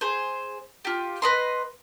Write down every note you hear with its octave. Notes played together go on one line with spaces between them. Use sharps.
G#4 C5
F4 G4
B4 D#5 C6